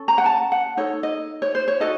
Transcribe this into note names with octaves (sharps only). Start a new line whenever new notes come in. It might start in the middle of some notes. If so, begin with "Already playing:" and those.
Already playing: C#4 A4
A#5
F#5
A5
F#5
D#4 A4 C#5
D#5
C#5
C5
C#5
D#4 F#4 A4 D#5